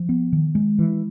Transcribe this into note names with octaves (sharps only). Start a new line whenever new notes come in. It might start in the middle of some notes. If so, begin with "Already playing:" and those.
Already playing: F3
B3
D#3
G#3
E3